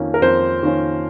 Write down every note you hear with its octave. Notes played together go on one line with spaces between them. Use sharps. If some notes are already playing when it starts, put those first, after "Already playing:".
Already playing: F2 D#3 A#3 C#4
A#4
F2 C5
D#3 A#3 C#4